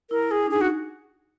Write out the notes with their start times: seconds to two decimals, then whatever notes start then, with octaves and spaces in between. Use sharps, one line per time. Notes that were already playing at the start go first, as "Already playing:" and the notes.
0.11 E4 A#4
0.31 E4 G#4
0.46 D4
0.50 D#4 G#4
0.61 F#4